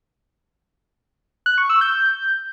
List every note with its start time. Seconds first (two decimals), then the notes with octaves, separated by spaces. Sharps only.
1.46 F#6
1.58 C#6
1.70 E6
1.81 G6